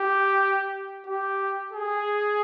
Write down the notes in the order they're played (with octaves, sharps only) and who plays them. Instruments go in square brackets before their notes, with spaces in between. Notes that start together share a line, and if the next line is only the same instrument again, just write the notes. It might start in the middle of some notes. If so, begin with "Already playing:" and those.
Already playing: [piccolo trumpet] G4
G4
G#4